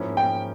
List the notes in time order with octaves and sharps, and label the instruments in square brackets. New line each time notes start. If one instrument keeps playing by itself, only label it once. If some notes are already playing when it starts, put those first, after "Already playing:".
Already playing: [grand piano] G#2 F3 A#3 C#4 E4
[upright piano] G5